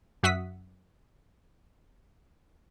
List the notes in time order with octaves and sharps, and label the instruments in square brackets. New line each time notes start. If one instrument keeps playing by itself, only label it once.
[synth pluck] F#2 F#4 E5 F#5 D#6 B6